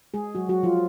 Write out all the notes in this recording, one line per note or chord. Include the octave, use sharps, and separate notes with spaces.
G#3 G#4
F#3 F#4
F#3 F#4
F3 F4